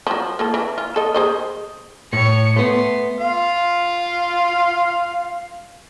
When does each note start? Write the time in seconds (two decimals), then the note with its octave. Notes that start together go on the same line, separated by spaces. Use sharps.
0.07 F3 F#3
0.39 A#3 F4 A4
0.54 E3
0.78 F4
0.96 A4 D#5
1.14 G#4 C5 D#5
2.13 A2 C#5 C#7
2.56 A3 B3 C6
3.20 F4 F5